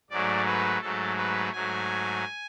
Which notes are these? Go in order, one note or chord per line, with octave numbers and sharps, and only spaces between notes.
G#2 F#3 A3 D5
B4
G#2 F#3 A3 A4
B4
G#2 F#3 A3 G#5